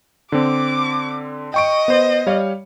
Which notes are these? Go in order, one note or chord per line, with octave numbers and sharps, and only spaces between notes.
D3 C4 D6
D#5 G5 C#6 D7
B3 C5
G3 C#5 F5